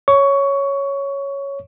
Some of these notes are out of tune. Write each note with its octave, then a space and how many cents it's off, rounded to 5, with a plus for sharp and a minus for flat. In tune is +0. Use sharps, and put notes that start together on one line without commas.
C#5 +0 C#6 +15